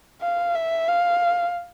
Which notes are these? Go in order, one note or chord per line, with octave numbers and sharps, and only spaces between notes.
F5
E5
F5